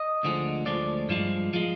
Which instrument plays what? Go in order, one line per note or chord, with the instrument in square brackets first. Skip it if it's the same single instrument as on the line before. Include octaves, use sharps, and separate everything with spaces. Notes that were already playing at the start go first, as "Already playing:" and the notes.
Already playing: [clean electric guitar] D#5
D2 D3 F3 G#3
D2 D3 F3 G#3 D5
G2 F3 G#3
F3 G#3